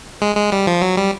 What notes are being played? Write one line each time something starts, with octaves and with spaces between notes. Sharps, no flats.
G#3
G#3
G3
F3
F#3
G3